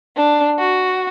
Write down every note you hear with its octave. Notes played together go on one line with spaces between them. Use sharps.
D4
F#4